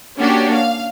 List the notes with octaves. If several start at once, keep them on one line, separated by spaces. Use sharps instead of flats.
A#3 C#4 D4 F#4 G4
F5